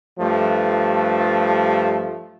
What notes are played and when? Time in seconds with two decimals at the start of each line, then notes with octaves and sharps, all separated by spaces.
0.19 G2 F3 A3